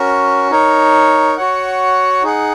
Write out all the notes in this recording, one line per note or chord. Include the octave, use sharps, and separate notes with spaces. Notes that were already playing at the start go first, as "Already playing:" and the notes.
Already playing: C#4 F#4 A#4
D#4 A#4 C#5
F#4 C#5 F#5
D#4 G#4 F#5